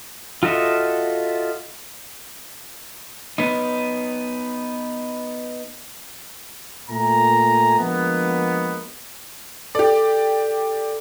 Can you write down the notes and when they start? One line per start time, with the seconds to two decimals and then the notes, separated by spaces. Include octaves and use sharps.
0.43 F4 F#4 A4 D#5 E5
3.38 B3 D#4
6.89 A#2 A3 G#5 A#5
7.79 D3 F3 G#3 A#3 B3
9.75 G4 A4 D5